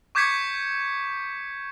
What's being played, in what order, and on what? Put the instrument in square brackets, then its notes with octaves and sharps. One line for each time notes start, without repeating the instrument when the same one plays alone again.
[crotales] C#6 D6 G6 G#6 B6 C#7